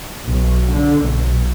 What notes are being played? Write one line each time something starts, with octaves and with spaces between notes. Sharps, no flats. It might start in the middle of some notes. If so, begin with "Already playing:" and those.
B1
D3
B1